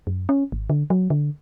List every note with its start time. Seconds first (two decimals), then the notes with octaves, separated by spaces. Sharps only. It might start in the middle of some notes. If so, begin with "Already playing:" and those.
0.07 F#2
0.29 C#4
0.52 G#1
0.70 D3
0.90 F#3
1.10 D3